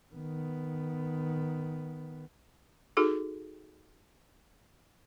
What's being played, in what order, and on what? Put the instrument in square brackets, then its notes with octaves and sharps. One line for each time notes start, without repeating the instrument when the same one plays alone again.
[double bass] D#3 B3
[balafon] D#4 F#4 G#4 A4